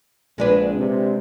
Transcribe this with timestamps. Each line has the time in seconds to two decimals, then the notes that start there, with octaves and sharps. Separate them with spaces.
0.38 A#1 G#3 D4 B4
0.74 C3